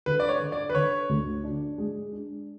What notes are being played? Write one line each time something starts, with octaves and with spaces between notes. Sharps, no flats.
D3 B4
D5
C#5
D3
D5
B4
D3 C#5
D2
D4
G#3
D4